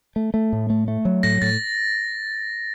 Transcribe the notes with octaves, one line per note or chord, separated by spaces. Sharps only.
A3
A3
A2
A3
A3
F#3
A2 A#6
A2 A6